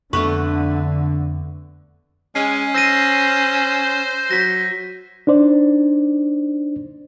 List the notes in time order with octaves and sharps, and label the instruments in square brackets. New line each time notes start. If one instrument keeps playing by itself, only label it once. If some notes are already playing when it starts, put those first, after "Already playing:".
[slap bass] F2 [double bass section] D3 [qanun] A3 B3 B4 [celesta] C#6
[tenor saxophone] G#3 [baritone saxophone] C#4 [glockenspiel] C7
[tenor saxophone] C5 [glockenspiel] E6 A#6 D#7
[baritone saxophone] F#3 [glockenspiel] A#6 B6
[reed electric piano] D4 D#4 C5 D5